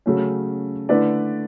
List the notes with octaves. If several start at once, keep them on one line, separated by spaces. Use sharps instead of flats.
C#3 F#3 A3 C#4
D3 A3 E4 B4 D5